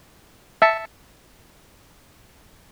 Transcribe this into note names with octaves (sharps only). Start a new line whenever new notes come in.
E5 A5 C#7